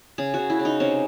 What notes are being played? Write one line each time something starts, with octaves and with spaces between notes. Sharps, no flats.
C#3 G#4
F#4
C#3
E4
C#3
D#4
C3 C#4